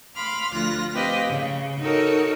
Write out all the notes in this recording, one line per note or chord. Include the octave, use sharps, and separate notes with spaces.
F5 B5 C6 D6 F6
D2 F3 F4 F#6 A#6
C4 G4 B4 D#5 F5
C#3
D#4 F#4 A4 A#4 C#5 D#5